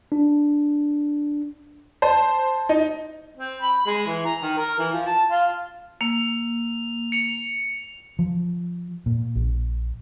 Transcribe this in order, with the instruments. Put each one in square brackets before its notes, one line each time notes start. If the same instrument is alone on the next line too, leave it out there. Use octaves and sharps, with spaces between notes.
[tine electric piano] D4
[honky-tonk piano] C5 [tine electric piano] A5
[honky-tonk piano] D#4
[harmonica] C4
B5
G#3
E3
A#5
D#3
A#4
E3
F3
A5
F4
[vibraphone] A#3 [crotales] F7
[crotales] C#7 F7
[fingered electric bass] F3
A#2
A#1